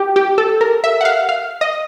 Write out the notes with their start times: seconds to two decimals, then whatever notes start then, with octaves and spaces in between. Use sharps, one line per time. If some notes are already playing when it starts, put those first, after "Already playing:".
Already playing: G4
0.16 G4
0.38 A4
0.61 A#4
0.84 E5
1.01 F#5
1.05 F5
1.29 F5
1.61 D#5